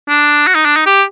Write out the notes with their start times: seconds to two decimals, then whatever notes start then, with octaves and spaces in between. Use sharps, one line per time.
0.09 D4
0.47 F#4
0.55 D#4
0.65 D4
0.76 D#4
0.86 G4